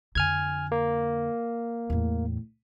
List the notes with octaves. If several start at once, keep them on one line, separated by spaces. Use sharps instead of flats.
F2 D3 G#5 F6 G#6
A#3
E2 A2